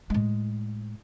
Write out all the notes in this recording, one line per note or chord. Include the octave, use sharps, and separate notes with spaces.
A2 G#3